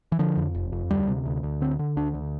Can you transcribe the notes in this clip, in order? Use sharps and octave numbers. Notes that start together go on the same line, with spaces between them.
E3
D3 F3
F2
F1
F2
D2 G3
C3
D2
D2
D3 C4
D3
D2 D4
D2